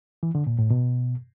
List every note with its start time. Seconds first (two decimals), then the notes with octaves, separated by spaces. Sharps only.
0.23 E3
0.35 D3
0.47 A#2
0.59 A2
0.70 B2